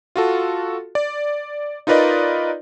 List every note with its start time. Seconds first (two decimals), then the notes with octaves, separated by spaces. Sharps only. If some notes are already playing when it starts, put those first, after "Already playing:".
0.16 F4 F#4 A4
0.95 D5
1.87 D#4 F4 A#4 B4 D5 D#5